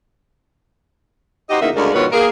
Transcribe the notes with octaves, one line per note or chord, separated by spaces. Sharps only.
D#4 F#4 G4 C5 D#5
E2 C#3 A#3 D#4 F#4 E5
D2 C#3 G#3 C#4 A#4 D5
G#2 B2 D#3 F3 B4 C#5
A#3 G#4 A#4